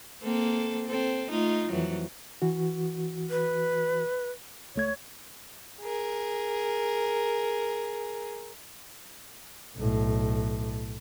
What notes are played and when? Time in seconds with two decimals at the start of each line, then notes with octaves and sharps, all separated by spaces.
0.23 A#3 C4 A4
0.88 C4 A4
1.30 A3 D#4 F4
1.70 F2 E3 F#3
2.42 E3 F#4
3.30 B4
4.76 C#2 A3 C#5 G#6
5.81 G#4 A#4
9.76 B1 A2